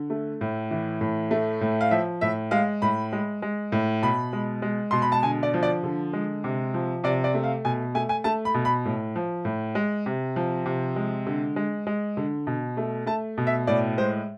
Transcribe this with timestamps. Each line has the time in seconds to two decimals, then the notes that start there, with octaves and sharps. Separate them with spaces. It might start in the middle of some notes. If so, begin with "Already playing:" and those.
Already playing: D3
0.10 A3
0.41 A2
0.71 E3
1.01 A2
1.31 A3
1.61 A2
1.81 F5
1.91 F3 E5
2.21 A2 E5
2.51 G#3 F5
2.82 A2 B5
3.13 G#3
3.42 G#3
3.72 A2
4.02 B2 B5
4.33 G#3
4.62 G#3
4.91 B2 C6
5.02 B5
5.12 A5
5.23 D3 G#5
5.43 D5
5.54 F3
5.63 D5
5.84 D3
6.13 G#3
6.44 C3
6.74 F3
7.04 C3 D5
7.24 D5
7.34 A3
7.44 F5
7.65 B2 G#5
7.95 A3 G#5
8.09 G#5
8.24 A3 A5
8.45 B5
8.54 B2
8.65 B5
8.85 A2
9.16 F3
9.45 A2
9.75 G#3
10.06 C3
10.36 F3
10.66 C3
10.96 G#3
11.27 D3
11.56 G#3
11.87 G#3
12.17 D3
12.47 B2
12.77 A3
13.06 A3 A5
13.38 B2
13.47 E5
13.67 A2 D5
13.98 G#3 C5